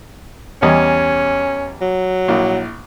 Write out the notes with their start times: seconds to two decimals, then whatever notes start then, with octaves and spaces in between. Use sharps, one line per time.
0.62 E2 G3 C#4 D#5
1.81 F#3
2.28 A#1 E4